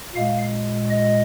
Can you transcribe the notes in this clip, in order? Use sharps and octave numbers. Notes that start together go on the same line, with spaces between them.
A#2 G#3 F5
D#5